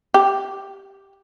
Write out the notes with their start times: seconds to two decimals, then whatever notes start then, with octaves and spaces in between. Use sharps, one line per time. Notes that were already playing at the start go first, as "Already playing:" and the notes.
0.14 G4